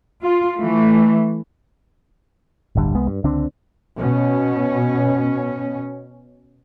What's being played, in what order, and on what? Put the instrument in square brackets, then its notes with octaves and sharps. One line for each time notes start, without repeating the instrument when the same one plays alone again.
[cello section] F4
E3 A3
[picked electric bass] D1 G1 D3 G3
C2 G#3 B3
G2
C#2 D3 C4 D4
[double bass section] B2 C#4